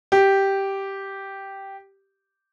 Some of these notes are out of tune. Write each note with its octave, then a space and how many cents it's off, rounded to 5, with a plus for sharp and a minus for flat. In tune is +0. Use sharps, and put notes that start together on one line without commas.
G4 -5